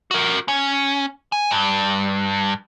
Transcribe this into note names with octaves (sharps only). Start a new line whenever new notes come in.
F#4 A#4
C#4
G#5
G2